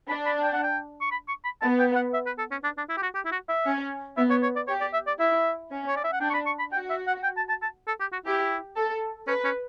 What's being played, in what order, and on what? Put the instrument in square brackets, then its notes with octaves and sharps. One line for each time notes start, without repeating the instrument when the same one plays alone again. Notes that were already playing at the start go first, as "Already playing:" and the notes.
[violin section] D4 [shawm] B5
[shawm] B5
G5
F#5
G5
C#6
B5
C#6
B5
[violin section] B3 [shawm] A5
[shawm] G5
F#5
E5
B4
A4
C#4
D4
D4
E4
G4
F#4
G4
E4
F#4
E5
[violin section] C#4
[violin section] B3 [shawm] E5
[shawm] C#5
C#5
D5
[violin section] G4 [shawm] C#5
[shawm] D5
E5
D5
[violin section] E4 [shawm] E5
[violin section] C#4
[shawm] C#5
D5
E5
F#5
[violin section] D4 [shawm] G5
[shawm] C#6
B5
C#6
B5
[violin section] F#4 [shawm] G5
[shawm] E5
F#5
G5
A5
A5
A5
A4
G4
F#4
[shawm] E4 [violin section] G4
[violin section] A4
[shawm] C#4 [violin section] B4
[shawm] C#4